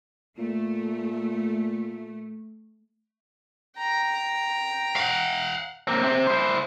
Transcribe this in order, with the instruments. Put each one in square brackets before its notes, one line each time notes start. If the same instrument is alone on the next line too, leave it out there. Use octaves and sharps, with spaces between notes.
[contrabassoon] A#2 [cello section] A3
[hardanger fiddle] G5 A#5
[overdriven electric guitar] F5 F#5
[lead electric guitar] A#3 C4
C3 C4
E4 C5